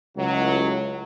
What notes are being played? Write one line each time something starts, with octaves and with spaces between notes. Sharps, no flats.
C#2 A2 F#3